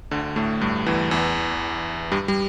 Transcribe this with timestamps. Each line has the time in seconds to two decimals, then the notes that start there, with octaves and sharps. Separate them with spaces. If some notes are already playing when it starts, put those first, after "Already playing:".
0.11 D2 D3
0.36 A2 A3
0.61 G2 G3
0.86 E2 E3
1.11 E2 E3
2.12 G2 G3
2.28 G3